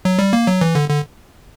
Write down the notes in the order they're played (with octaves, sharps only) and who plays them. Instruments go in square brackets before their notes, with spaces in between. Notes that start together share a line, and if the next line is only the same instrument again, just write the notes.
[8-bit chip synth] F#3
G3
A#3
F#3
E3
D3
D3